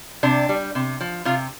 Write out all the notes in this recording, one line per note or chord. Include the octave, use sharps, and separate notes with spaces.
C3 D4
G3
C3
F3
C3 F4